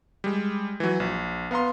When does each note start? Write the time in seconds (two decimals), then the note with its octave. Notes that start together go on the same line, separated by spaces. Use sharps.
0.24 G3 G#3
0.80 E3 F#3
1.00 A#1
1.51 B3 F5 A#5 C6